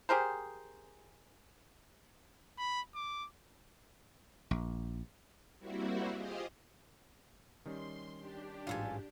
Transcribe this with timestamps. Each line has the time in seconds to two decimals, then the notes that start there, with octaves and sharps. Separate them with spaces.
0.09 G4 G#4 A#4 C5
2.58 B5
2.95 D6
4.51 A#1
5.59 G3 A#3 C4 E4 F#4
6.13 F4 G4 G#4 C5 D#5 F5
7.66 D#3 G3 C#4 C6
8.20 D4 G4
8.67 A1 G#2 F#3 F4 A4 G#5